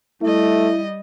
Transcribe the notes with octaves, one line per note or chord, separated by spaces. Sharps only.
G3 A3 E4 D#5